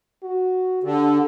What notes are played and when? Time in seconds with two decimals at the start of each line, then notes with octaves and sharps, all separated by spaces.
0.23 F#4
0.83 D3 G4